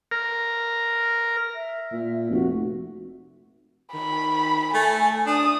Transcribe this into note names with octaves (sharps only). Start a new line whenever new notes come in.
A#4
E5
A#2
F1 F#4
D#3 B5
A3 G#5
D4 D#6